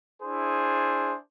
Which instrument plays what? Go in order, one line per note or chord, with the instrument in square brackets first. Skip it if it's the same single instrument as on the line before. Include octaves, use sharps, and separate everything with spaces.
[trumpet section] D4 E4 G#4 C5